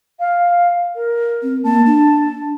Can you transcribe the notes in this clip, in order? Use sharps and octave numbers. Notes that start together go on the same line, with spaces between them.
F5
A#4
C4
A#3 A5
D4